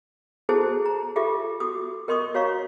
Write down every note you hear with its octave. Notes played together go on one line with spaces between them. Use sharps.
E4 F#4 G#4 A4 C5 A5
A#5
F4 G4 A4 E5 D6
F#4 D6 D#6
A#4 D#5 C6 C#6 D#6
F#4 C#5 F5 A#5 C#6